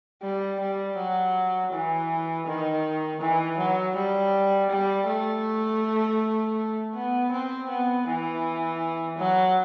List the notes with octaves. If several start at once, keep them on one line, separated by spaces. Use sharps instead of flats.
G3
G3
F#3
E3
D#3
E3
F#3
G3
G3
A3
B3
C4
B3
E3
F#3